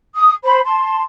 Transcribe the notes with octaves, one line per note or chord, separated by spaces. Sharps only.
D#6
C5 B5
A5 C6